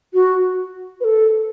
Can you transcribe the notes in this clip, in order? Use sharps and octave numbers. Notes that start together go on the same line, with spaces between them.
F#4
B4
A4